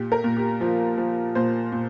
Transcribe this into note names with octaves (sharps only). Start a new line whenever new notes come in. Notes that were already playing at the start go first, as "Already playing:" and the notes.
Already playing: A#2 G4
A#4
A#2
G4
F3 F4
F3
A#2 C5
A#2